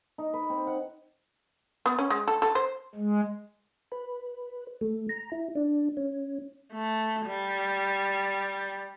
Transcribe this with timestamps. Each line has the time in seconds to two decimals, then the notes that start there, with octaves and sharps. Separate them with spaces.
0.18 D#4
0.33 B4
0.50 C4
0.67 F#5
1.86 B3
1.99 C#4
2.10 G#3
2.28 A4
2.42 A4
2.55 C5
2.95 G#3
3.92 B4
4.81 A3
5.09 A#5
5.32 E4
5.55 D4
5.97 C#4
6.72 A3
7.26 G3